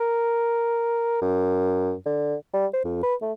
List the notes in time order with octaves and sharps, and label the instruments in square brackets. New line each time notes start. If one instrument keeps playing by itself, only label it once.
[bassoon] A#4
F#2
D3
G3
C5
F2
B4
A3